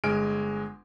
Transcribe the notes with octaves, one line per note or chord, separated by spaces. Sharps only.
G1 G#3 G#5 F6 D7